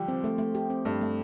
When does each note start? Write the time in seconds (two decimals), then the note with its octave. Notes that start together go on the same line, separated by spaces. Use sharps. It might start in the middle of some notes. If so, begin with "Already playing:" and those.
Already playing: D3 F3 G3 G4
0.08 C4
0.24 A3
0.38 A3
0.55 G4
0.70 C4
0.85 G2 A3
1.01 A3